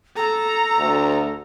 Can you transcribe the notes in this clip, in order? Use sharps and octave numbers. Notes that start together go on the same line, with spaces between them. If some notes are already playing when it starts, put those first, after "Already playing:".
A4 A#5
D2